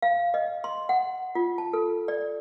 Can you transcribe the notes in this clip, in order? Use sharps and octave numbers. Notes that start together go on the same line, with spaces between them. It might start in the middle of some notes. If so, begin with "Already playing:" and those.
F5
D#5
C6
F#5
F4
A5
A4
D5